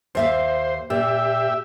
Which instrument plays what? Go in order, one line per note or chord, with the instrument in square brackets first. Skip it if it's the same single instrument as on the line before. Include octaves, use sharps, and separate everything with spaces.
[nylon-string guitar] D#2 E5 F5 [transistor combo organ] C5
[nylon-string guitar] A#2 [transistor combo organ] G4 E5